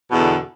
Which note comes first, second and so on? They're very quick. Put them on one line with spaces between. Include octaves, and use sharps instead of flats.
B2 E2 D3